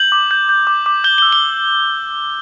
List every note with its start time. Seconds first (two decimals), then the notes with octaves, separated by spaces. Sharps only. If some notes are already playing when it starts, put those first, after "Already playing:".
Already playing: G6 F#7
0.12 D6
0.31 G6
0.49 G6
0.67 D6
0.86 D6
1.04 G6 G7
1.18 E6 G7
1.33 G7